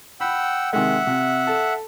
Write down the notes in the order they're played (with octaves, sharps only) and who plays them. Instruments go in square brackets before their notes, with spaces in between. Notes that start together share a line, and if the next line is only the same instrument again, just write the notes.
[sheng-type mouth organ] F#5 G5 E6 [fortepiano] B5
[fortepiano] C3 D#3 G#3 [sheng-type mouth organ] E5 F#5
[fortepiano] C3
A4